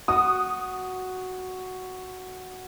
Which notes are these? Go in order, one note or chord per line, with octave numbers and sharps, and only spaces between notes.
F#4 C#6 D#6